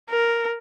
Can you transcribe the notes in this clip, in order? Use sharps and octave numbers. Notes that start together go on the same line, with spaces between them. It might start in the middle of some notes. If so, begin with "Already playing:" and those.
A#4